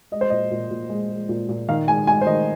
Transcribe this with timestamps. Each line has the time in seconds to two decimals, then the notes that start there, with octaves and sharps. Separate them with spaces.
0.12 G#3 D#5
0.21 C5
0.30 A#2 D#5
0.51 A#2
0.70 A#2
0.90 G#3
1.10 G#3
1.29 A#2
1.49 A#2
1.68 D#3 F5
1.88 G#3 G#5
2.07 G#3 G#5
2.21 C5
2.27 D#3 D#5